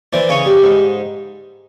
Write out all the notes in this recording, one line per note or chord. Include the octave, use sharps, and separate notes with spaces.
E3 C5 D5
C#3 C#5 D#5
G3
G#2